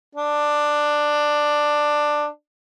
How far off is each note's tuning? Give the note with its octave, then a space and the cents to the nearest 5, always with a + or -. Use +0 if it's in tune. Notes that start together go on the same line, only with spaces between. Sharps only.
D4 +10